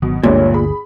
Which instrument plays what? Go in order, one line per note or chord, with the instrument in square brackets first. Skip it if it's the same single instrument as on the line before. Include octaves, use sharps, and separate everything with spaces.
[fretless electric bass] G#1 D#3 F#3 [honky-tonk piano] B2
[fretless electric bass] G1 D2 [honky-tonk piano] G2 G#3 G4 [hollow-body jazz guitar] A#2 [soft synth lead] C#5
[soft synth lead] G#4 [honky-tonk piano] B5